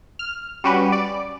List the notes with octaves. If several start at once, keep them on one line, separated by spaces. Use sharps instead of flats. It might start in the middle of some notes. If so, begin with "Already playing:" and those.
F6
G3 C#4 F#4 G4 B4
D5